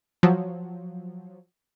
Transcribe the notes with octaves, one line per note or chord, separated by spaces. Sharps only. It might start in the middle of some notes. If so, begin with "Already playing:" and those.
F3 F#3